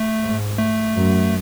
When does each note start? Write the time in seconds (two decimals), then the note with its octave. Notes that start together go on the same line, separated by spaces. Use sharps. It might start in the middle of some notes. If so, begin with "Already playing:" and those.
Already playing: A3
0.23 G#2
0.58 A3
0.96 F#2